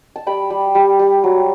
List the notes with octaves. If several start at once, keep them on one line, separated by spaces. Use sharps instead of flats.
A5
G3 G5 B5
G3
G3
G3
F#3